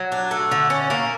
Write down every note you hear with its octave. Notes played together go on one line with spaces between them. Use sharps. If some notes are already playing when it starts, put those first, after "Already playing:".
Already playing: F#3
D4
A3
D3
C#4
A#3